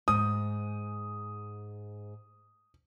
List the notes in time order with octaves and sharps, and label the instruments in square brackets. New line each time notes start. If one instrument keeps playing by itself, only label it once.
[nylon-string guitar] G#2 [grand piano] D#6